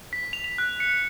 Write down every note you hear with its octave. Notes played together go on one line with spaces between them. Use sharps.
B6
F7
F7
F#6
C#7